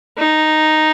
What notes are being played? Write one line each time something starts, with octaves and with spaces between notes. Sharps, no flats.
D#4